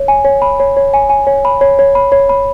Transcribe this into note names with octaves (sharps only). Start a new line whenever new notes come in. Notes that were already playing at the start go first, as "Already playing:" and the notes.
Already playing: C#5
G#5
C#5
B5
C#5
C#5
G#5
G#5
C#5
B5
C#5
C#5
B5
C#5
B5